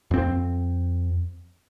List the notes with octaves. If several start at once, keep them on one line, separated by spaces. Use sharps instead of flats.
F2 C4